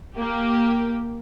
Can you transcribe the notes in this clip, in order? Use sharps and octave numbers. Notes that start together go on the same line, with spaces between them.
A#3 G4